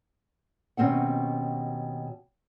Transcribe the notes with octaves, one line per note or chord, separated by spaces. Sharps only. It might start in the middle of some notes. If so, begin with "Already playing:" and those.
D#2 B2 C4 C#4 F#5